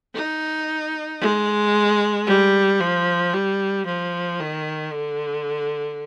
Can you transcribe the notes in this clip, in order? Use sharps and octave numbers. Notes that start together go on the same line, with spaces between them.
D#4
G#3
G3
F3
G3
F3
D#3
D3